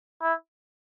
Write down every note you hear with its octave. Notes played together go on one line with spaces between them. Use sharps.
E4